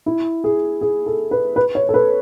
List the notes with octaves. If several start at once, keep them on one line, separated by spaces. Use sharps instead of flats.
E4
G#4
G#4
A4
B4
B4
C#5
A4
B4